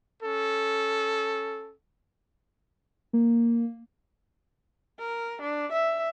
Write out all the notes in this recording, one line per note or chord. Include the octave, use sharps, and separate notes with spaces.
C#4 A4
A#3
A#4
D4
E5